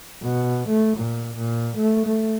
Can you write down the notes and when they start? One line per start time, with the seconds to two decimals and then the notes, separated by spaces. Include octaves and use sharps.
0.23 B2
0.68 A3
0.97 A#2
1.36 A#2
1.77 A3
2.06 A3